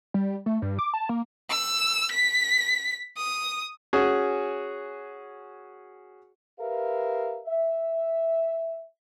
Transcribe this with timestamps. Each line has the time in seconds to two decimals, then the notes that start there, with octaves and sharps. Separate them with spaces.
0.14 G3
0.46 A3
0.62 G2
0.79 D6
0.94 A5
1.09 A#3
1.50 E6
2.12 B6
3.17 D#6
3.93 C#4 F#4 G#4
6.59 G4 A#4 B4 E5 F5
7.47 E5